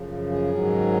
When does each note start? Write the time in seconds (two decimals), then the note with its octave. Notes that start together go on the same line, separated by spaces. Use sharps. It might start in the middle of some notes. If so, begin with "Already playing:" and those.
Already playing: F#2 C#3 F3
0.30 G#4
0.51 G#2 D#3 F#3